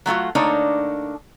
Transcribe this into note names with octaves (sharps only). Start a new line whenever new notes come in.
F#3 A3 F4 F#4
D3 A3 A#3 D4 D#4 C#5